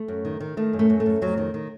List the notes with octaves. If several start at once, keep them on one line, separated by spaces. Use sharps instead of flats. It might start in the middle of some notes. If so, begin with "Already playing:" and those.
Already playing: A3
F#2
D#3
D#3
D#3 A3
F#2
A3
F#2
A3
F#2
F2 F#3
D#3
D#3